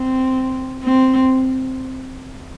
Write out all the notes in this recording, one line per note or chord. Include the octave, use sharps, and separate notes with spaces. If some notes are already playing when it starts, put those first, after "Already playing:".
Already playing: C4
C4